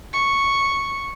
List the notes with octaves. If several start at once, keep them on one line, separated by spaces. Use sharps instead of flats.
C#6